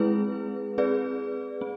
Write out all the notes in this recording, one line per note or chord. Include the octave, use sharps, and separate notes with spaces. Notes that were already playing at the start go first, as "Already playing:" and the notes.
Already playing: G#3 C4 E4 G#4 B4
C4 G#4 B4 D5
C4